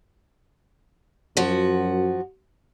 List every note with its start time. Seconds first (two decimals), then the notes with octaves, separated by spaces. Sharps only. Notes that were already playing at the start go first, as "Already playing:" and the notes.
1.37 F#2 F3 F#4